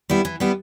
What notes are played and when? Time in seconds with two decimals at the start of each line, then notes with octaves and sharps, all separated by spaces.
0.10 G3 B3 E4
0.25 E3
0.40 G3 B3 E4